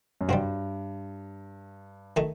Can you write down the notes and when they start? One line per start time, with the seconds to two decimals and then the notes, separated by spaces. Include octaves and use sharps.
0.21 F#2
0.28 G2 G3 C4 F#4
2.16 D#3 A3 D#4